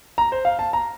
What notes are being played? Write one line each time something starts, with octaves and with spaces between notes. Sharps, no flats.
A#5
C5
F5
A5
A#5